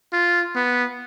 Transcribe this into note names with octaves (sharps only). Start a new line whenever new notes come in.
F4
B3